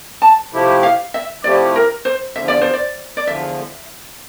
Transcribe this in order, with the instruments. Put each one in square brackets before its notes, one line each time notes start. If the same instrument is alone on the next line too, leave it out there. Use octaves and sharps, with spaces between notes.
[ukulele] A5
[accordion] C3 F3 A3 E4 G4
[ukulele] F5
E5
[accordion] C3 F3 A3 E4 G4 [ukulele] D5
[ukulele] A#4
C5
[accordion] E2 D3 F3 [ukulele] E5
[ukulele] D5
C5
D5
D5
[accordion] E2 D3 F3 [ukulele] E5